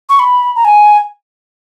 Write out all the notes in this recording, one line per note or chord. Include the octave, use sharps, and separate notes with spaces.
C#6
B5
A#5
G#5